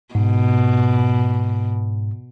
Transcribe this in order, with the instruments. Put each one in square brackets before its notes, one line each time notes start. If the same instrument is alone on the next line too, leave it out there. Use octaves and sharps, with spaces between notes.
[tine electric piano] G#2 [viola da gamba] B2